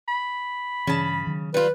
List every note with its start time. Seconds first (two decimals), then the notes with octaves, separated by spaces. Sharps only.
0.08 B5
0.87 G2 C#3 E3 A5
1.27 D#3 F#3
1.54 G3 F4 B4